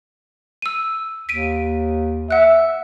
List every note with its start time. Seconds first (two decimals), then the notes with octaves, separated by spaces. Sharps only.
0.62 E6 D#7
1.29 D#2 B6 D7 D#7
2.31 E5 F#5 F#6